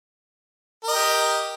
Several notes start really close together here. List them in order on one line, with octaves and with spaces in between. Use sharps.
A#4 D#5 G4